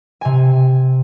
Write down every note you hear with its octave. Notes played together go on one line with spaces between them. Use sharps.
C3 G#5